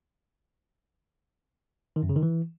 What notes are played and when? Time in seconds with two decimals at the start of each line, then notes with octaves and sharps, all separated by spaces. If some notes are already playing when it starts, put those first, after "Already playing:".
1.96 D#3
2.03 F#2
2.09 C#3
2.16 D#3
2.23 E3